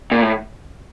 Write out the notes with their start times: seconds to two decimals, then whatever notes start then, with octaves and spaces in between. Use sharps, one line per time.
0.11 A#2
0.22 A2